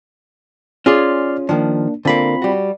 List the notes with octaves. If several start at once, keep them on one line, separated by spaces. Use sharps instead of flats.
C#4 F4 G#4 D5 C6 F6
D#3 F3 A#3 D4
D3 A#3 C4 F4 B5
G3 F#4